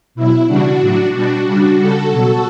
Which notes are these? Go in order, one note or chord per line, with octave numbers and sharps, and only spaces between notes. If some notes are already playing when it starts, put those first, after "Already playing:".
B2 F#3 E4
C#3 E3 G3 D4 F#4
A2 F#3
B2 G3 D4 F#4
C#3 G3 D4 F#4
C#3 G3 F#4 A4
B2 F#3